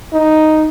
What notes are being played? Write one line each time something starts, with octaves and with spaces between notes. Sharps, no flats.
D#4